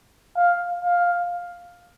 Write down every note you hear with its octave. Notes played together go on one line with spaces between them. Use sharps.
F5
F5